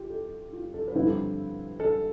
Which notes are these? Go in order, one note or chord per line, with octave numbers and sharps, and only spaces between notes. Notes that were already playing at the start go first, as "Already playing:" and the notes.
Already playing: F4 G4
A4
F4
A4
B4
G2 D3 F3 C4 E4
A4
A4